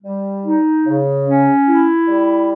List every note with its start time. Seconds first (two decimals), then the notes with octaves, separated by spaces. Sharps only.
0.03 G3
0.45 D#4
0.85 C#3
1.26 C#4
1.68 E4
2.08 G3